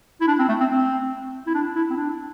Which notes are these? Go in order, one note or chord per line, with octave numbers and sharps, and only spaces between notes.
E4
D4
C4
A3
C4
C4
E4
D4
E4
C4
D4